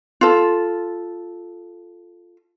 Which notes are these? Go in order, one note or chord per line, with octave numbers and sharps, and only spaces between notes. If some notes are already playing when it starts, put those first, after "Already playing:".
F4 A4